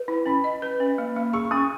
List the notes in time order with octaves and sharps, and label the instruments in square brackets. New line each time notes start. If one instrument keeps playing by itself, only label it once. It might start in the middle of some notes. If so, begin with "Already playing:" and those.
Already playing: [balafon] B4
E4
[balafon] C#4 [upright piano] B5
[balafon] D#5
B4
C#4
A#3
A#3
[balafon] G#4 [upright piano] C#6
[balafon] C#4 [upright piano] D#6